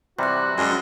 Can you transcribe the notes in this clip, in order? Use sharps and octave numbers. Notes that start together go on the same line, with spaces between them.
C3 E3 G3 F#4 C6 F#6
F#2 G#3 D4 G#4